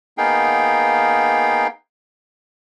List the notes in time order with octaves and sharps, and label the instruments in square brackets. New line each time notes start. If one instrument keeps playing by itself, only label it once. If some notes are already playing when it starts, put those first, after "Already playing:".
[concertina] A#3 B3 D#4 G#4 F5 G5